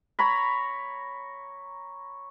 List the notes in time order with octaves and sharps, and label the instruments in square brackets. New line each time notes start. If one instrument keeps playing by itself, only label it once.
[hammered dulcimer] C#5 A#5 B5